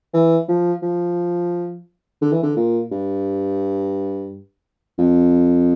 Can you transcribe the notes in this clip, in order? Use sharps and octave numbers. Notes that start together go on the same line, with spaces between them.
E3
F3
F3
D3
E3
D3
A#2
G2
F2